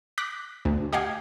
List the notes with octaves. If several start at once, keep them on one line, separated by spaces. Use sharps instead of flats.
D6 F#6 A#6 B6
D2
G4 D#5 F5 F#5 G#5